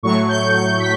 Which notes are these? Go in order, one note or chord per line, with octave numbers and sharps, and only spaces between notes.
A2 F#3 A3 C#6
G6
G6
A2 B6